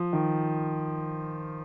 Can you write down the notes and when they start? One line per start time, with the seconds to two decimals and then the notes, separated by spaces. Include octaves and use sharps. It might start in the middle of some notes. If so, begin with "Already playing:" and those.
Already playing: F3
0.13 D#3